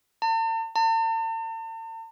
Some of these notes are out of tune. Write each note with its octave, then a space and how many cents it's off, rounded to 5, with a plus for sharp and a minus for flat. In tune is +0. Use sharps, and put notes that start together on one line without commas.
A5 +45
A5 +45